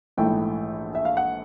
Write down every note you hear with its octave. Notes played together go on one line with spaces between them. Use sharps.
A#1 G#2 E3 A3 G5
E5
F5
F#5